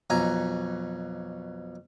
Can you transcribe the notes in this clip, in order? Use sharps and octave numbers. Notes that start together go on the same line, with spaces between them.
B1 F2 G#5 A#5